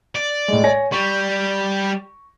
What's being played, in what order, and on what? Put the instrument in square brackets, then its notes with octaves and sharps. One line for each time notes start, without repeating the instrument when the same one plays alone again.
[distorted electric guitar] D5
[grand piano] A2 G#3
C#5 G#5 A#6
[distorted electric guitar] G3 [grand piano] C#6